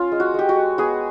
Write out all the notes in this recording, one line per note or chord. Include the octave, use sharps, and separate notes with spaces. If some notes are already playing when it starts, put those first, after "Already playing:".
Already playing: C#4 F4
G#3
F#4
G#3 G4
F#4
G#3
B3 F#4 G#4